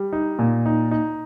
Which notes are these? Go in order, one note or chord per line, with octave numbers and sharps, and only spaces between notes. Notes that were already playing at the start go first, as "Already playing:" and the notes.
Already playing: G3
D#4
A#2
D#4
D#4